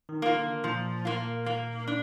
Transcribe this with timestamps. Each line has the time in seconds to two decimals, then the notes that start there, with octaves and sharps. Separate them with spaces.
0.09 D#3
0.22 A#3 F4
0.36 D3
0.64 A#2 F3
1.05 A#3 F4
1.46 A#3
1.87 D4